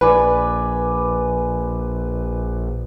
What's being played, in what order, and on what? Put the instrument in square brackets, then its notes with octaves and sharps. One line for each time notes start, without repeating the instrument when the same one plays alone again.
[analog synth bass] A#1 [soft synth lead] B4 [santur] D5 G#5 B5